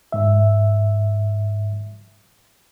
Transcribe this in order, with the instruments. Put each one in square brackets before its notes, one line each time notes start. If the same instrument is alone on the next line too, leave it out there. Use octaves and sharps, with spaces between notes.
[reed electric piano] G#2 E5